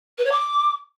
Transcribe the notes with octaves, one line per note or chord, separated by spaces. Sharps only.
B4
C#5
D6